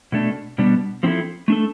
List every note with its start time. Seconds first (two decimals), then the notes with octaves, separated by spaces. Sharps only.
0.12 B2 A3 D4
0.58 B2 G3 B3 D4
1.03 F3 C4 E4 A4
1.48 A3 D4 A4